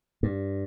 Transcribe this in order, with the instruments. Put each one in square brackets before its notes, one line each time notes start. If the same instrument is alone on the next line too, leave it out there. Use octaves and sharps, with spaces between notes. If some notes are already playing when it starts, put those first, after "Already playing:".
[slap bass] G2